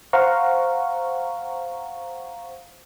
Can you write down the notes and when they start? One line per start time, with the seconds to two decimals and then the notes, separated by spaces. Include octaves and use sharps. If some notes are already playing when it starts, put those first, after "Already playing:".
0.13 C5 F5 F#5 A#5 C#6